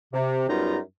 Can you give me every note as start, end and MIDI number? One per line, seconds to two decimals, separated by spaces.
0.13 0.46 48
0.49 0.78 42
0.49 0.78 55
0.49 0.78 59
0.49 0.78 63
0.49 0.78 65
0.49 0.78 82